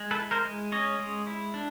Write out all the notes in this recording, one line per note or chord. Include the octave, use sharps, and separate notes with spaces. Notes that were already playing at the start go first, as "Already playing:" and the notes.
Already playing: G#3
A4 B4
E4
A#4 C5
G#3
C#4 C#5 D#5
G#3
E4
D4